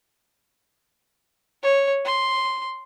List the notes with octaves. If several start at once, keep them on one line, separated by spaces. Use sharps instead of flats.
C#5
C6